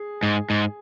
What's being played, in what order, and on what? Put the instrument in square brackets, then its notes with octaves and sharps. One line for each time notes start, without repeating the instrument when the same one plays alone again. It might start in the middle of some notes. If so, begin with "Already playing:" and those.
Already playing: [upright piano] G#4
[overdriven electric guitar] G#2
G#2